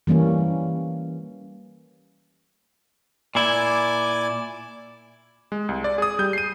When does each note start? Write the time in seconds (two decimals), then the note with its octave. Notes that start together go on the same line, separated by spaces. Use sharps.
0.07 E3 G3 A#3 C#4
3.35 A#2 E4 D5 G#5 D6
5.52 G#3
5.69 C2
5.84 D5
5.98 G#4 D#6
6.19 G3 G6
6.33 C7 D#7